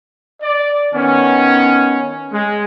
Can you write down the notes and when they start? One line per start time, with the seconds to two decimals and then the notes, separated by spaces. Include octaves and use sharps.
0.41 D5
0.93 D#3 B3 C#4
2.32 G#3